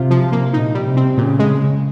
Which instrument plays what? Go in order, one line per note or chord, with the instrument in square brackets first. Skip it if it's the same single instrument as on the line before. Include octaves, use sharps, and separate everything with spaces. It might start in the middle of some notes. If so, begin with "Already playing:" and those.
Already playing: [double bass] C3 [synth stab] F4
[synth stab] F3
A#3
[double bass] A#2 [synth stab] D#4
[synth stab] G3
[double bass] C3
[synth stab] C4
[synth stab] A#2 [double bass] C#3
[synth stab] G#3